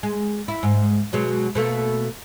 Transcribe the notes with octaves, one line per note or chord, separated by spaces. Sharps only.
G#3
E4
G#2
B2 F#3 G#3
B2 A3 A#3